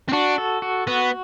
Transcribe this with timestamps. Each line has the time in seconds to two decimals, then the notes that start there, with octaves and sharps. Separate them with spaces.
0.09 C4
0.12 D4 F#4
0.38 A4
0.62 F#4
0.87 B3 F#4